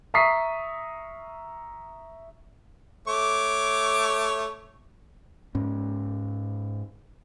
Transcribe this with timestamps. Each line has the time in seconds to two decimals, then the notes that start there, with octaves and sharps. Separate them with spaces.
0.14 E5 A#5 C#6 D#6 B6 C7
3.08 A3 C#5 D6
5.55 G#2 C#4